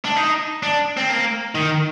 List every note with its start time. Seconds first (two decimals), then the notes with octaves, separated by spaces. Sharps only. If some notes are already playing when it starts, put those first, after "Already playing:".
0.05 D4
0.17 D#4
0.63 D4
0.97 C4
1.09 A#3
1.55 D#3